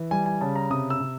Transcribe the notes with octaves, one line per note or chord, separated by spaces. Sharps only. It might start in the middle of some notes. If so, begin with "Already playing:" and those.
Already playing: E3
G3 G#5
G#5
C#3 A5
A#5
C3 D#6
E6
C3